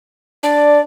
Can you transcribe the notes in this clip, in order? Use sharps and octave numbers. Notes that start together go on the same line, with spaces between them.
D4 D5